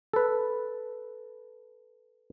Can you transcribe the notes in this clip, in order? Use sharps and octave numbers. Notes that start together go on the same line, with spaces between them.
A4 B4